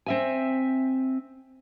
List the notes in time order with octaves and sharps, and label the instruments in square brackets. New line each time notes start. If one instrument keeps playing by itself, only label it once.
[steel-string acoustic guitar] C4 E5 G#5